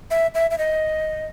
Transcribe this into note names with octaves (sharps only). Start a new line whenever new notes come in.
E5
E5
E5
D#5